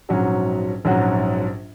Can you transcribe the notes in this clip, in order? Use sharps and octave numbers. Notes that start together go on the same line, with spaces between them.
A#1 G#2 F#3 C#4 F#4
A#1 G#2 F#3 C#4 F#4